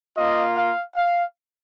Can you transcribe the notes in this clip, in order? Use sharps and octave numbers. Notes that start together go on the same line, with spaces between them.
A#3 F4 D#5
F5
F5